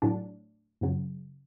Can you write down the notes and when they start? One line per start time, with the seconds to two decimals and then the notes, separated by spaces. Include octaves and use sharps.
0.02 A2 F#3 D4
0.81 F#2 C#3 F#3